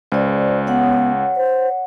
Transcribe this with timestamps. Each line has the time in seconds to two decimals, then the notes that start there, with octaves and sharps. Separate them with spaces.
0.12 C#2 C5 D5
0.67 B3 C#5 F#5
1.37 C5